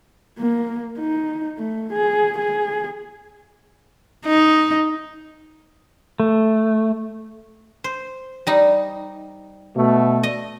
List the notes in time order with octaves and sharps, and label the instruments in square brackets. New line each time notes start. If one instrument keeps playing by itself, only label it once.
[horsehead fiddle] A#3
D#4
A3
G#4
G#4
[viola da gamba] D#4
[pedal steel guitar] A3
[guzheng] C5
G3 D#4
[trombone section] B2 A3
[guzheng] D#5